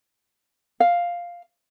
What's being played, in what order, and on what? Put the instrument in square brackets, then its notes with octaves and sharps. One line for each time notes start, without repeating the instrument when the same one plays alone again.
[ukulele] F5